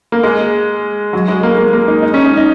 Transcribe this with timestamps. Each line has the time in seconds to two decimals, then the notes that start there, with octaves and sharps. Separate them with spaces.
0.12 A#3
0.23 G#3
1.13 F#3
1.28 G#3
1.43 A#3
1.58 A#3
1.73 A#3
1.88 D#4
2.03 D#4
2.14 C#4
2.25 D#4
2.37 D#4